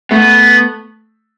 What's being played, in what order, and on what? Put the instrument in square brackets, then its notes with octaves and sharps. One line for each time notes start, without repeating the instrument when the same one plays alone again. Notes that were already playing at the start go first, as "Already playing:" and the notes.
[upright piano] A3 [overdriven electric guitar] B3